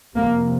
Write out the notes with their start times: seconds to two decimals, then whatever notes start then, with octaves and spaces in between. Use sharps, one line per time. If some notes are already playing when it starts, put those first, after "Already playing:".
0.15 F2 C3 A#3